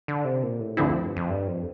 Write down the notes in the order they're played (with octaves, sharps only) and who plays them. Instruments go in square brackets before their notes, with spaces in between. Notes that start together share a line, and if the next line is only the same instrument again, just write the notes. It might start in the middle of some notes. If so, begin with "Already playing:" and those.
[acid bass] D3
C3
A#2
A2
[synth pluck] D2 D3 F3 C4 E4 [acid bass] G2
[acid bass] F2
G2
F2
G2
F2